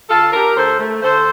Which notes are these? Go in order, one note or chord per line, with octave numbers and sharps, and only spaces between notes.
D3 F4 A4
D4 G4 A#4
D2 A4 C5
A3
D3 A4 C5